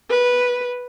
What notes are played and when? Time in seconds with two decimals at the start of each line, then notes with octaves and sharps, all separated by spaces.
0.10 B4